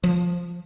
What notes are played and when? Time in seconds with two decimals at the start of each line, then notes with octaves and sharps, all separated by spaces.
0.04 F3